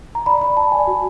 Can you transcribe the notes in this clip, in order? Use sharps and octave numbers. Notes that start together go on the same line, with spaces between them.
A#5
D5 B5
D5 B5
D5 A5
D5 G#5
F#4